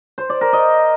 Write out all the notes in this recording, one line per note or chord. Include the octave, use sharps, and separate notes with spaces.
C5
D5
A#4
D#5